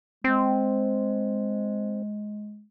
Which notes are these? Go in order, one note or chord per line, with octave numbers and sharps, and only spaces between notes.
G#3 C4